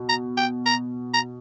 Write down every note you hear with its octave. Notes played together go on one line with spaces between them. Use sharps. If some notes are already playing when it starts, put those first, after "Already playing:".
Already playing: B2
A#5
G5
A#5
A#5